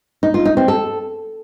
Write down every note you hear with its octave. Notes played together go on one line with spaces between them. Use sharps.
D#4
F4
D#4
C4
A4